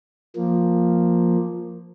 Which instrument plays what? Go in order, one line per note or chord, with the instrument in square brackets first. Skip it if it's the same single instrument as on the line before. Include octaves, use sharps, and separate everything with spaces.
[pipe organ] F3 A#3